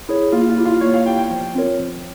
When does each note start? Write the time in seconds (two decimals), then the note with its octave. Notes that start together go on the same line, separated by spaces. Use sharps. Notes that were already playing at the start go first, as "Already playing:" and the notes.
0.09 E4 G#4 C#5
0.32 A#3 F4
0.49 F4
0.57 E4 G4
0.65 F4
0.81 A#3 C#5
0.94 F5
1.06 E4 G4 G5
1.18 G5
1.31 F3
1.55 C4 F4 A#4 C#5
1.79 F3